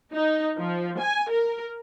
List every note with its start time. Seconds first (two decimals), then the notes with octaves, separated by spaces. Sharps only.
0.13 D#4
0.57 F3
1.00 G#5
1.30 A#4